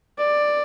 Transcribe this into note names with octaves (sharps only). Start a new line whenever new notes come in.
D5